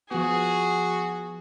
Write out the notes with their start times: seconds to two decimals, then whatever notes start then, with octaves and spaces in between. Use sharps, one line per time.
0.11 F3 B3 F#4 G#4